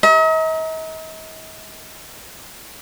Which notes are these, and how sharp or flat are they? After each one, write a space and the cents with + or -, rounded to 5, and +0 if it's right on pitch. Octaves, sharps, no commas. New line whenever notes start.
D#5 +45 A#5 +0